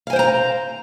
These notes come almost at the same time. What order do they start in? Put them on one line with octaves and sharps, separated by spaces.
F5 G#5 C5 G5 A#5